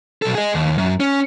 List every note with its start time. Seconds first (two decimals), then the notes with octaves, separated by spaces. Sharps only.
0.22 B1 A4
0.35 G#4 D#5
0.55 D#2
0.78 F#2
1.00 C#4